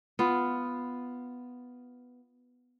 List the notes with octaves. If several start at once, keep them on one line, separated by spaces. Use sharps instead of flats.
B3 F4